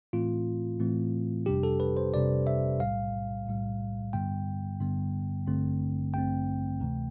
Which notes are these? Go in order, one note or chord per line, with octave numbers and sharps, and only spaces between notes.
A2 E3 A3 C4 F4
A2 E3 A3 C4
G1 F2 C3 G3 D4 G4
A4
B4
C5
G1 F2 C3 G3 D4 D5
E5
B1 A2 G3 F5
B1 A2 G3
G2 D3 G3 B3 G5
G2 D3 G3 B3
A1 G2 D3 A3 C4
A1 G2 D3 A3 C4 G5
D2 C3 E3 A3